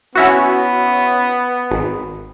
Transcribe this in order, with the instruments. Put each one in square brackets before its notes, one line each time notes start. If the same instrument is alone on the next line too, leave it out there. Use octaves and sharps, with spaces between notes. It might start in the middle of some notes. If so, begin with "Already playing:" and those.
[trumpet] B3 [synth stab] C#4 E4 F#4
[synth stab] G#1